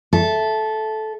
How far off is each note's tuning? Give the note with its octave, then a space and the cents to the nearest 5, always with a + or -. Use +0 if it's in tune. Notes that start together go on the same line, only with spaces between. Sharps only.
A4 -15 E5 +0